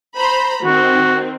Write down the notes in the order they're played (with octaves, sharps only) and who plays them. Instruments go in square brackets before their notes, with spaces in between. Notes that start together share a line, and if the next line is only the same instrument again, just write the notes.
[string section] C5 A#5 B5
[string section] D#3 C4 [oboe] F#4